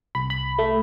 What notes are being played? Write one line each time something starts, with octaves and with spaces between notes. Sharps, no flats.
C2 B5
B5
A3